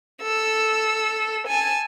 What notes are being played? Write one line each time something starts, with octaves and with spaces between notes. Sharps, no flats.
A4 E6
G#5 A5